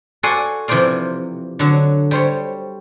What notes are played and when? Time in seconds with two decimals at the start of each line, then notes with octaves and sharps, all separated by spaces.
0.23 F#4 A4 D5 F#5 G#5 C6
0.68 C3 E3 F3 C5 D5 F5
1.59 D3 F#3
2.11 G3 C5 C#5